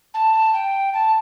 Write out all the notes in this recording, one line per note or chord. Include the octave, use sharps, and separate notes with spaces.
A5
G5
A5